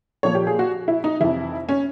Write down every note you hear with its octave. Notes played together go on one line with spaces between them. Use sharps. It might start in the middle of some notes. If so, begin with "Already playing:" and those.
A#2 F3 C#5
G4
G#4
F#4
E4
D#4
F2 C3 E3 E4
C#4